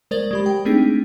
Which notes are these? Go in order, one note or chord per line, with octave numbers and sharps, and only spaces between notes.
G#3 A#4 C5 D5 A6 F#7
G#3 G4 B5
G5
A3 C4 D4 D#4 G#4 B6